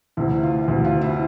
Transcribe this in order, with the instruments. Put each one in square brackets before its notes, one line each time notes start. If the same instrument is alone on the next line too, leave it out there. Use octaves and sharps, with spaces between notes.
[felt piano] D2 C3 E3 E4
F4
D2 C3 E3 F#4
F4
E4